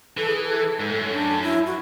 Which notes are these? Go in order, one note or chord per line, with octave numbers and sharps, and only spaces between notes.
E3 A4
G#4
A4
G#2
A2
F#2
D4
E4
F#4